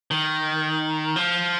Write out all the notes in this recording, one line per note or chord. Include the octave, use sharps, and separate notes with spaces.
D#3
F3